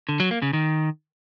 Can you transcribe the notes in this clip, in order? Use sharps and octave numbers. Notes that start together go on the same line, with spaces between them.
D3
F#3
A#3
C#3
D#3